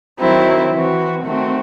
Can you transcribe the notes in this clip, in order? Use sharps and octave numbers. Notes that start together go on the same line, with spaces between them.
D#3 F#3 C4 E4
E3 C4 F#4
D#3 A3 C4 F#4